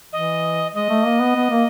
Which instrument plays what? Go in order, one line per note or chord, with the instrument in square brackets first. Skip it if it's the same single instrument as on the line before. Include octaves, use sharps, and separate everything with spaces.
[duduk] E3 [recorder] D#5
[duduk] G#3 [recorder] D#5
[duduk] A3
A#3
B3
B3
A#3